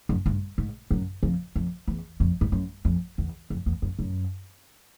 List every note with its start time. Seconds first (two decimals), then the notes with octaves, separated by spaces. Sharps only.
0.09 F#2
0.26 G2
0.58 G#2
0.91 F#2
1.23 F2
1.56 F2
1.88 E2
2.20 F2
2.41 G2
2.52 F#2
2.85 F2
3.18 E2
3.50 F2
3.66 E2
3.82 F#2
3.99 F#2